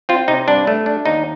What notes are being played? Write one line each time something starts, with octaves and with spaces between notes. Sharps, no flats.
C4 F4
C3 D#4
G2 D4
A3
D4
D#2 D#4